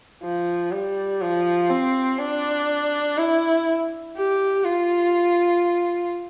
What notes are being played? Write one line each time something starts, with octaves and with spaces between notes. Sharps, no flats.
F3
G3
F3
C4
D4
E4
G4
F4